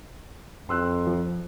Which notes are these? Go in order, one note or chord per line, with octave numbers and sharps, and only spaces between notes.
F2 C6 E6 F#6
F3